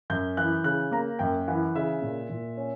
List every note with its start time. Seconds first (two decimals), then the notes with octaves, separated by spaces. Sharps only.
0.10 F#2 G6
0.37 E3 F#6
0.64 C#3 F#6
0.92 A#3 A#5
1.19 F#2 G5
1.48 E3 F#5
1.75 C#3 E5
2.02 A#2
2.29 A#2
2.57 C#4